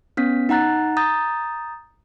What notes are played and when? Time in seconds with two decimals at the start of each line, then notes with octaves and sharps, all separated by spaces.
0.17 B3 C#4 B6
0.49 D#4 F#5 A#5 F#6 A6
0.97 A#5 D#6 G6 A6